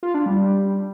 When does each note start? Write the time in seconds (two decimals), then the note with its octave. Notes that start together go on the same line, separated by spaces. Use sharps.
0.03 F4
0.14 D4
0.26 G3